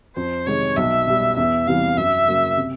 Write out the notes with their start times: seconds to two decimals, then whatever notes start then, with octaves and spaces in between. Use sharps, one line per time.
0.17 F2 C5
0.46 C3 D#3 G#3 C#5
0.77 B1 E5
1.07 B2 G3
1.37 E2 E5
1.67 C3 E3 G3 F5
1.97 F#2 E5
2.28 C#3 F#3 A#3
2.57 C3